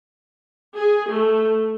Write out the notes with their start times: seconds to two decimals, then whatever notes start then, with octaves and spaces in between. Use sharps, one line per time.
0.75 G#4
1.11 A3